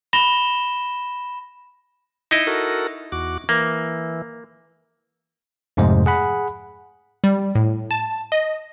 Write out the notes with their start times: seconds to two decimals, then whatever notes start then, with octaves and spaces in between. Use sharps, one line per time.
0.13 B5 A#6 E7 G7
2.31 D#4 E4 D#5
2.47 F#4 A4 A#4
3.12 E2 F#4 D6
3.49 E3 A#3
5.77 F2 G#2 C3 A3 C5 D#5
6.06 G#4 F#5 B5
7.24 G3
7.55 A2
7.91 A5
8.32 D#5